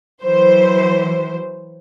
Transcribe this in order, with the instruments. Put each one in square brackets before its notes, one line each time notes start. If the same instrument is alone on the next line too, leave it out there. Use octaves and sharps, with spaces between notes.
[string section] E3 F#3 C5